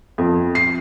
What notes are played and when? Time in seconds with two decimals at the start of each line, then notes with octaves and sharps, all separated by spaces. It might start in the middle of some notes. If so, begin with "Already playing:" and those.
0.18 F2
0.55 C7